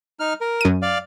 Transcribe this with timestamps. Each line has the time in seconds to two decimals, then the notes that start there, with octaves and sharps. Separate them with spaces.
0.20 D#4 F6
0.41 A#4
0.61 F#2 D#7
0.82 D5 F5